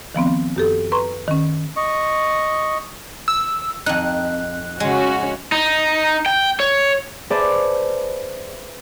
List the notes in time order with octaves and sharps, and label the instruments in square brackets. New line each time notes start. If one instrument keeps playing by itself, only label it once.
[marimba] D#3 F3 B3 C4
F#2 G4 A4
B4 A#5 C6 C#6
D#3 C#4
[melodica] D#5 C#6
[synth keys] E6
[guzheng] F2 D#4 [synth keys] F#6
[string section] C#3 C#4 F#4 [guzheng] G#3
[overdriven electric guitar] D#4
G5
C#5
[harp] G#4 B4 C5 D5 E5 A5